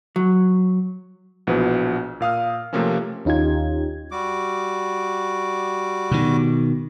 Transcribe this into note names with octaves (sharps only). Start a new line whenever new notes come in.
F#3
A#1 B2 E3 F3 B4
A#2 F5 D#6 F6
C3 F3 A3 A#3 C4 C#4
D#2 C#4 D#4 F4 G4 G#6
G3 F#4 D6
B2 D#3